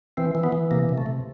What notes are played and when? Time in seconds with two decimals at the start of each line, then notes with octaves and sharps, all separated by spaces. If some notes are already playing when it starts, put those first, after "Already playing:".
0.17 E3 C4
0.35 E3
0.44 B3
0.52 E3
0.71 C3 A#3
0.89 C3
0.98 A3
1.06 C3